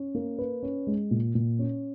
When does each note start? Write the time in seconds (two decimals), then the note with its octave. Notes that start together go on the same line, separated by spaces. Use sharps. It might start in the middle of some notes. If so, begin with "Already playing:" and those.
Already playing: C#4
0.15 A#3
0.39 B4
0.63 C#4
0.87 G#3
1.11 A#2
1.35 A#2
1.59 C#4